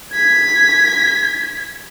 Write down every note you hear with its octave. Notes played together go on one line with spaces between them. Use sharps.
G#6 B6